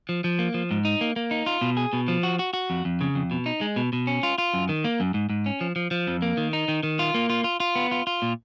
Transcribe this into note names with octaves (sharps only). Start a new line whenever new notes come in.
F3
F3
A#3
F3
G#2
D#4
A#3
A#3
D#4
F4
B2
G#4
B2
F3
F#4
F#4
F#4
F2
F2
C#3
F2
B2
D#4
G#3
B2
B2
C#4
F4
F4
F#2
D#3
A#3
F#2
G#2
G#2
C#4
F3
F3
F3
F2
A#3
D#3
D#4
D#3
D#3
F4
A#3
F4
F4
F4
B3
F4
F4
A#2